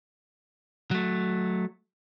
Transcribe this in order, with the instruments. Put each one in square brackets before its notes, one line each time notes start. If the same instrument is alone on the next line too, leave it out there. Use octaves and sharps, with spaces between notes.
[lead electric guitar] F#3 A3